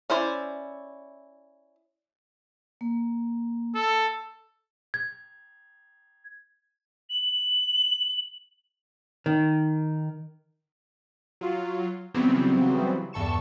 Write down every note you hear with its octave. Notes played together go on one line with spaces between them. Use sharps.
C#4 E4 C5 D5
A#3
A4
G#6
F#7
D#3
F#3 F4
C#3 E3 F#3 G3 B3 C4
E2 G2 A4 C#6 E7